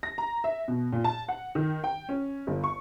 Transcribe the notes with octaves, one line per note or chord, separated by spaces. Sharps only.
A#6
A#5
E5
B2
A#2
A5
F#5
D#3
G5
C#4
G1
C#6